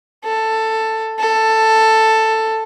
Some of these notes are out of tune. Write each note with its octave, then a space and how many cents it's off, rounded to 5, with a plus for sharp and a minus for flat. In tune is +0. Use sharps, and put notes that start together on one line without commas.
A4 +10
A4 +10